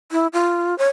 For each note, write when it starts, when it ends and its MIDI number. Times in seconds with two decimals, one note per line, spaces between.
0.12 0.27 64
0.33 0.77 65
0.78 0.88 73